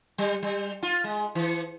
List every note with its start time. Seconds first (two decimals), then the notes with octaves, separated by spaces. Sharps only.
0.18 G3
0.43 G3
0.83 F4
1.04 G#3
1.35 E3